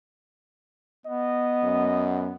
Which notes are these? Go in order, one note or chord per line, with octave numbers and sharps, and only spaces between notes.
B3 D#5
F#2